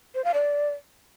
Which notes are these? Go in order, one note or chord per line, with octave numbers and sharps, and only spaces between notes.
C5
F5
D5